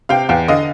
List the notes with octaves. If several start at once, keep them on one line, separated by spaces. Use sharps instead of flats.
C3 F5 G5
E2 F5 G5
D3 D#5 F5